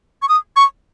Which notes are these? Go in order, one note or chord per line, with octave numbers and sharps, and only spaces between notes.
C#6
D#6
C#6